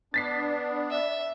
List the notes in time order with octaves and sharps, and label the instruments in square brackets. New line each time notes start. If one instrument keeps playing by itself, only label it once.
[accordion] B3 D4 [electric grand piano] A6 B6 C7
[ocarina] D5
[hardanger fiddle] E5